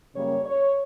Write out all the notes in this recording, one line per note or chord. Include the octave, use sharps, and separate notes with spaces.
F#2 C#3 G3 A#3 C#5
C#5